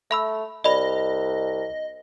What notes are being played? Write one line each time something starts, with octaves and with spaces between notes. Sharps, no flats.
A3 E5 B5 E6
C2 D5 D#5 B5